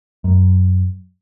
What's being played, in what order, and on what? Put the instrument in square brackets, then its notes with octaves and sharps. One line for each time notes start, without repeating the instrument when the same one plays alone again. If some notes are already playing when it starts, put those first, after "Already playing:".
[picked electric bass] F#2